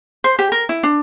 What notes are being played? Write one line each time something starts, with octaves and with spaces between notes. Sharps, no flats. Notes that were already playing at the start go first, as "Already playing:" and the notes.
C5
G4
A#4
E4
D4